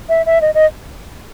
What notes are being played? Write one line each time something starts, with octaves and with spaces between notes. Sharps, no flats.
E5
E5
D#5
D#5